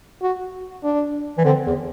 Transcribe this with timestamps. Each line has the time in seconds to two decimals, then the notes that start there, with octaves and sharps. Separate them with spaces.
0.22 F#4
0.84 D4
1.38 E3
1.45 D3 C4
1.66 E2